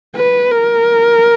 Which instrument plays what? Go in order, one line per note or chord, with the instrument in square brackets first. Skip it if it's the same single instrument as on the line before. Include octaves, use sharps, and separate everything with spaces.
[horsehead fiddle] B4
A#4